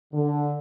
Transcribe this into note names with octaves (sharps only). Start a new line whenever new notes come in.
D3